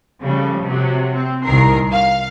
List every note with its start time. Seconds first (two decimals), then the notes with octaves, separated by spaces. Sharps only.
0.22 C#3 F3 G3 A3
0.64 C3 F#3
1.14 C4
1.44 C2 D#3 A#4 C7
1.93 F5